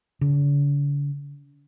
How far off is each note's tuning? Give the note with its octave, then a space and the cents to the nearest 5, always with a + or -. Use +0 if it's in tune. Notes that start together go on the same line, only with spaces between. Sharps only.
D3 -45